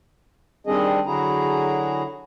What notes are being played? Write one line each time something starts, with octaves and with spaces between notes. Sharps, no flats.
D#3 G3 C4 D4 G#4 D#5
D3 F#3 E4 F#4 G#4 A#5